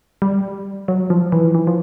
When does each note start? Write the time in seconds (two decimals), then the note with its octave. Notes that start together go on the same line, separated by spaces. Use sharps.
0.22 G3
0.88 F#3
1.10 F3
1.32 E3
1.55 E3
1.67 F3